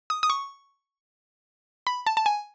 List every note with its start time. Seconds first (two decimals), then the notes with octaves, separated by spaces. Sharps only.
0.10 D#6
0.23 D#6
0.30 C#6
1.87 B5
2.07 A5
2.17 A5
2.26 G#5